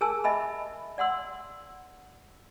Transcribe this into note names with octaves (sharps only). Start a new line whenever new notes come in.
G#4 A#4 G#5 A5 E6
D#5 E5 G#5 B5
D5 F#5 C6 E6